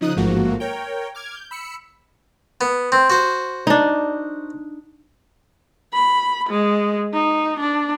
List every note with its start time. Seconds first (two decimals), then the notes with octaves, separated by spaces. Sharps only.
0.01 C#3 F3 D#4 D#6 F#6
0.16 A1 G#2 F3 A3 A#3 F#4
0.60 A#4 C#5 G5
1.15 D6 F6 G#6
1.35 G6
1.51 B5 E6 C#7
2.61 B3
2.92 C4
3.10 F#4 C5
3.67 D4 D#4
5.94 B5
6.49 G#3
7.13 D#4
7.60 D4